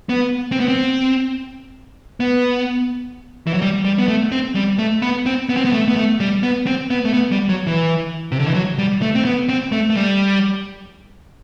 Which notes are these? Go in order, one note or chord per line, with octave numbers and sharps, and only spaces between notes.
B3
C4
B3
C4
B3
E3
F#3
G3
G3
B3
A3
C4
G3
A3
B3
C4
B3
C4
B3
A3
B3
A3
G3
B3
C4
B3
A3
B3
G3
F#3
E3
C3
D3
E3
F#3
G3
A3
C4
B3
C4
A3
A3
G3